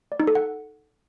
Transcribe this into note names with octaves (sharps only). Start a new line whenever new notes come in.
D5
D#4
A4
F#5